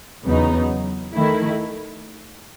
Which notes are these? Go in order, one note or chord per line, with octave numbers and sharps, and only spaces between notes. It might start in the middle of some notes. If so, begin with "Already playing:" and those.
E2 C#3 F#3 B3 D#4
D#3 A3 E4